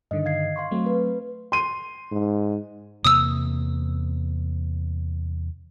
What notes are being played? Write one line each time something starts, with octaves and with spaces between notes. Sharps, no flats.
G2 D3 D#3 D#5
F5 G#6 C7
F5 C6 C#6
F#3 A3 C4
B4
C6 D#7
G#2
E2 C3 A#3 D#6 E6